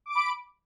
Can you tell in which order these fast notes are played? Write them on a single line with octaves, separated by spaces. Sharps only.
D6 D7 B5